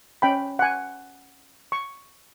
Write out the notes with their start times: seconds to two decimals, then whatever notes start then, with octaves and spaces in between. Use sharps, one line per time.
0.22 C#4 G5 B5
0.59 F#5 G#5
1.72 C#6